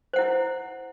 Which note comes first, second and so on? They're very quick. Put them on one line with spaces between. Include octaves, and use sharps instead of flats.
C5 F#5 E4